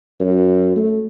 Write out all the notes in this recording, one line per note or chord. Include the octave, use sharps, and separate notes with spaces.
F#2
A3